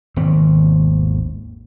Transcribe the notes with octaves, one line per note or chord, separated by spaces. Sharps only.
G#1 D#2 B2 C4